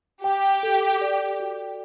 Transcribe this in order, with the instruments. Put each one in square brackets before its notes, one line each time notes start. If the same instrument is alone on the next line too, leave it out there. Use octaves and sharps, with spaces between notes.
[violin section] G4 [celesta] G5
[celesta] A4
D5
F#4